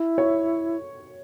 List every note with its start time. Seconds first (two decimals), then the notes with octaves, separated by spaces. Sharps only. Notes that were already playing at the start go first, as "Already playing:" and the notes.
Already playing: E4
0.18 C#5